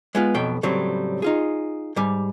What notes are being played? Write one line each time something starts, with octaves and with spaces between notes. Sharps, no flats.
G#3 B3 F4
B1 F2 B2 F#3 G5
A2 C#3 F#3 G3 C4
D#4 F4 G#4
G#2 G3